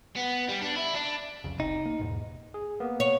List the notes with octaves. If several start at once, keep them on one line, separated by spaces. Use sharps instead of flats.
B3
G3
D4
E4
D4
C2 F2 C#3
F1 C3 D#4
A#3
E2 G#2 B2
G#4
A#3 B3
C#5